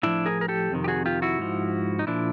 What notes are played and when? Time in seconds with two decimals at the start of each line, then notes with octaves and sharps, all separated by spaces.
0.03 A2 F3 D4 E4
0.26 G#4 A#4
0.41 A#4
0.48 G4 A4
0.72 F2 C3 D#3
0.84 G4
0.88 F#4 G#4
1.06 F4 G4
1.22 E4 F#4
1.39 G#2 F3
1.99 D#4
2.07 A#2 F3 D4 E4